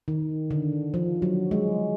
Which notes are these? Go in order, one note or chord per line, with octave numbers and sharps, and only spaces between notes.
D#3
D3
F3
F#3
G#3